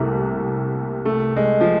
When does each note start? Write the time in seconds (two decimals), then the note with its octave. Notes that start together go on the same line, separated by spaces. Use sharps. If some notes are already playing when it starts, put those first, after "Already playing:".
Already playing: C2 C3 A3 A#3
1.05 A3
1.36 G#3
1.60 F3